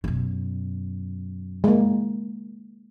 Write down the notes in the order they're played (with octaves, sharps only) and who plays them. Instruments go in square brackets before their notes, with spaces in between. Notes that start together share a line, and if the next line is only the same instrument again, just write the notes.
[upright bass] F#2 B2
[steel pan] G#3 A#3